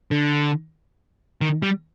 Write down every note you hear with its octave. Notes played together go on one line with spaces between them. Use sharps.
D3
D#3
G3